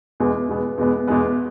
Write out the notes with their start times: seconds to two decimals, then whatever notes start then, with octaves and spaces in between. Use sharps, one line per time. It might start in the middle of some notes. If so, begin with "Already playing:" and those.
0.20 E2 B2 G#3 B3
0.49 E2 B2 G#3 B3
0.78 E2 B2 G#3 B3
1.07 E2 B2 G#3 B3